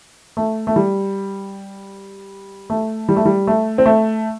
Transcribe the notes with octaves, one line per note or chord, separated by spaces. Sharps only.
A3
A3
G3
A3
G3
A3
G3
A3
C4
A3